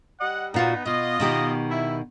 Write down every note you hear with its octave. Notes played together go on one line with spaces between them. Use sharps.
G3 D#5 F#5
A#2 B3 D#4 F4 F#4
B2 F4 D#5
B2 D#3 G4
E4